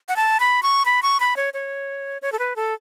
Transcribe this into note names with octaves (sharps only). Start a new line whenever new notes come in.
F#5
A5
B5
C#6
B5
C#6
B5
C#5
C#5
C#5
A4
B4
A4